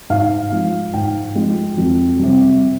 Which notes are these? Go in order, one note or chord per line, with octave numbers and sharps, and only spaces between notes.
G#2 F5
F3 G#3
G#2 G5
F3 G#3
F2
C3 G3